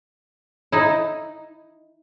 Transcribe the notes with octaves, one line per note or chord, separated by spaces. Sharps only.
D#4 E4